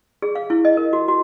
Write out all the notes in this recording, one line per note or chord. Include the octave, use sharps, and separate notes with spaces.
G#4
F5
E4
D#5
A#4
F#4
F#4